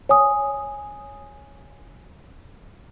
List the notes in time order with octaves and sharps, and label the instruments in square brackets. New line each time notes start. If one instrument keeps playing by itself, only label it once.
[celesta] C#5 G#5 D#6